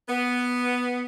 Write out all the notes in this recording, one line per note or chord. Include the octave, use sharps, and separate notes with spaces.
B3